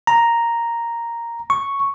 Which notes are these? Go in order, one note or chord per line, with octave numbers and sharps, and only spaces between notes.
A#5
C#6